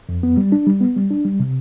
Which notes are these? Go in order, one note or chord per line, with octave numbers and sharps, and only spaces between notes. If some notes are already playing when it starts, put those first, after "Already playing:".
F2
B3
G3
D4
G3
B3
G3
D4
G3
C3